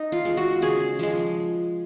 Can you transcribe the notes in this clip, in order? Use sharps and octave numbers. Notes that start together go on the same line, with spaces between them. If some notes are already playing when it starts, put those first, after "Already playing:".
Already playing: D#4
F4
G#3
F#4
C#3 G#4
F3 G#3